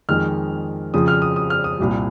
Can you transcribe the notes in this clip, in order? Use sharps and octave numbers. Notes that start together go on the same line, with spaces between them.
F2 D#3 G#3 F6
F2 C#3 F3 D#6
F6
D#6
D#6
F6
D#6
C2 A#2 G3